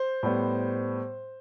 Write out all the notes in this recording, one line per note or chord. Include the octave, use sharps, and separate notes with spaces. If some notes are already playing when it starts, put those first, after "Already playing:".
Already playing: C5
A2 G3 B3